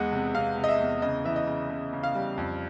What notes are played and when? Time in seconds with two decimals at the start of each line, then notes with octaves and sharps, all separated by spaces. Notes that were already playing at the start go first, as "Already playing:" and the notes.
Already playing: E2 G#3 F#5
0.12 C3
0.34 C3 F5
0.57 C3
0.64 D#5
0.68 E5
0.80 E2
1.02 C#3 D#5
1.25 E3 E5
1.36 D#5
1.47 C#3
1.70 C#3
1.93 C#3
2.03 F5
2.15 G3
2.37 F2